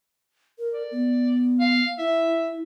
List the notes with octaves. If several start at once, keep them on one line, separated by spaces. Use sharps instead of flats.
A#4
D5
B3
F5
E4 E5